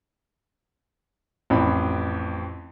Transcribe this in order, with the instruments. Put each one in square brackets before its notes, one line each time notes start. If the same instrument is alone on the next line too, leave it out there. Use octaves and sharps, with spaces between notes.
[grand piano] A1 F2 B5